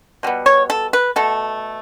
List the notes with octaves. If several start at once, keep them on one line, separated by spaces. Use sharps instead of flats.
B2 G3 B3
C#5
A4
B4
B2 A3 A4